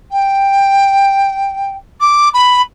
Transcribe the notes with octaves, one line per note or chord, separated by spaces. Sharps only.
G5
D6
B5